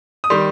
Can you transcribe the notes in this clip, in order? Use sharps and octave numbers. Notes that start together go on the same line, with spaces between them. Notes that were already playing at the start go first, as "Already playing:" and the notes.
D#6
D#3 G3 C6